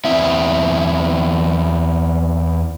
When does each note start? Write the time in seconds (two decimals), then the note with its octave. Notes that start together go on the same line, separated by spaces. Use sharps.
0.05 E2 C4 E4 E5